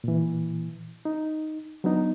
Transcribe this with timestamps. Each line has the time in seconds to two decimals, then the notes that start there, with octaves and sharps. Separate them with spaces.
0.04 A#2 E3
1.05 D#4
1.84 F#3 B3 D4 D#4